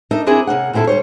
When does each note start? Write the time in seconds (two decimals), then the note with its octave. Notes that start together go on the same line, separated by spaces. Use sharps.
0.11 D4 D#4 A#4 D#5 E5
0.27 C4 D4 E4 G#4 A#4
0.47 C3 A#3 C#4 F#5
0.73 D#2 A#2 C4 E4 A4
0.87 D2 G3 C5 C#5